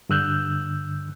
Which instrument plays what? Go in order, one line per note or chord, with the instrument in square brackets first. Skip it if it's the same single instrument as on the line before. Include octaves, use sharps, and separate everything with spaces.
[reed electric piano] G2 D3 E6 F#6 G6